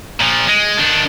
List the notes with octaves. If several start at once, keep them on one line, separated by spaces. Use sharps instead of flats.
A#2 F3
G#3
D#3 D4